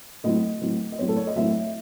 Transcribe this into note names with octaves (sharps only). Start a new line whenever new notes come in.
A2 F#3 C4 D#5
A2 F#3 C4
D#5
A2 F#3 C4 C#5
A4
C#5
D#5
A2 F#3 C4 E5